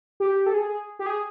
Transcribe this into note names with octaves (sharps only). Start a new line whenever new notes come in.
G4
A4
G#4
G4
G#4